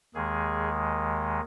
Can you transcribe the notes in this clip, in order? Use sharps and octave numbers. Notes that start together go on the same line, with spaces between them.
D#2 D#3 G#3 G#4